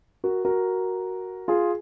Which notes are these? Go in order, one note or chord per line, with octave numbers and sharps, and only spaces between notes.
F#4 A#4
F#4 A#4
F4 G#4